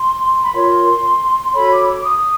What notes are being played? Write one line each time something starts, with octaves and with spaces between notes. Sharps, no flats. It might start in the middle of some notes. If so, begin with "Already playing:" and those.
Already playing: C6
B5
F4 A#4 C#5 C6
F#4 A4 C#5 B5
D6
D6
D#6